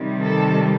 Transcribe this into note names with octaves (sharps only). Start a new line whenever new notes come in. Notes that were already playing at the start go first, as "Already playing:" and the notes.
Already playing: C3 D#3 G3
A4